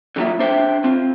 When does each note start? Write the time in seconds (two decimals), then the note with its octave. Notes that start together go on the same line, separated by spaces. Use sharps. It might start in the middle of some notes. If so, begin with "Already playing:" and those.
0.16 D3 F#3 G3 A#3 F4 E5
0.39 D4 C5 E5 G5
0.84 C4 F4